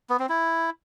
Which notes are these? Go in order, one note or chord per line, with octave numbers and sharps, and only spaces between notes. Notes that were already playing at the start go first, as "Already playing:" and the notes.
B3
C4
E4